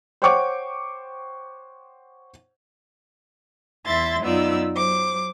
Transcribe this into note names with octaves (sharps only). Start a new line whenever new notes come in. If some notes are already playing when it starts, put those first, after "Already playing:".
C5 C#5 F#5 G5 C#6 D6
E2 E4 E5 C6 A6
F#2 B3 D#4 F4 D5 E6
F#3 C5 D6